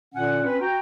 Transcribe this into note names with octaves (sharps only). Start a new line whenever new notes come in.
A#2 D3 C#4 F#5
C4 C#4 B4
F#4 G5 A#5